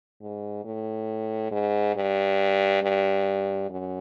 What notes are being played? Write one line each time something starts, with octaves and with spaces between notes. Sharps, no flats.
G#2
A2
G#2
G2
G2
F#2